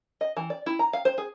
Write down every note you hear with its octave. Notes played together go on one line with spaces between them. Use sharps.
D#5
E3
D5
E4
A#5
F5
C5
G#4